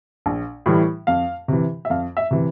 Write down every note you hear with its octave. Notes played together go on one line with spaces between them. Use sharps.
A#1
A2 E3 G3
F2 F5
C3 E3
E5
F2 F5
E5
C3 E3